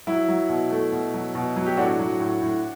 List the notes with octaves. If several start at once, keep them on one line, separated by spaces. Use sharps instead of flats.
F#3 E4
F#3
B2
A3
B2
F#3
B2
F#3
G4
A2 D4 F#4
F#3
A2
A2